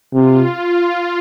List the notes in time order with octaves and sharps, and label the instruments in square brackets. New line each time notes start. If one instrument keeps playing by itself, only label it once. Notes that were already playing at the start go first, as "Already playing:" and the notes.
[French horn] C3 [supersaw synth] F4